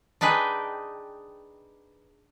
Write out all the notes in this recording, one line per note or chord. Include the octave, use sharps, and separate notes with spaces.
D4 D#4 G#4 B4 G5